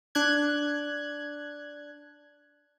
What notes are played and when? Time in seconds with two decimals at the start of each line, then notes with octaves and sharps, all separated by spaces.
0.15 D4 F#6 G#6